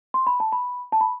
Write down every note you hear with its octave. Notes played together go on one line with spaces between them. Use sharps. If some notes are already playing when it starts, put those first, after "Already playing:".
C6
B5
A5
B5
A5
B5